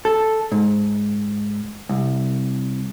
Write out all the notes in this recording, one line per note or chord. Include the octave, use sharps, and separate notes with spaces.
A4
G#2
C2